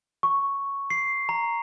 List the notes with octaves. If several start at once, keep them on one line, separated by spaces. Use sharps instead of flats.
C#6
C7
A#5